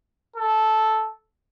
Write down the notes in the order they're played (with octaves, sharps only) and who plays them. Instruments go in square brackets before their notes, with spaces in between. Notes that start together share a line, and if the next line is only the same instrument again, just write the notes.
[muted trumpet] A4